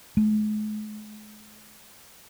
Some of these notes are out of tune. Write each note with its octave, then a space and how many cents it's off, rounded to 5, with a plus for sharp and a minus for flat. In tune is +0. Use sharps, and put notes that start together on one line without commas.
G#3 +45